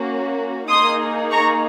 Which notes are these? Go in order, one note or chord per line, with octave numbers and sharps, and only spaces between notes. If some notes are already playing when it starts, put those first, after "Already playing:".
Already playing: A#3 C#4 F#4
A#3 D#4 G#4 C6 D#6
A#5 C#6